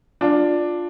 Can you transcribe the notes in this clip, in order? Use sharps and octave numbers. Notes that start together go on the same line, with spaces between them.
D4 F4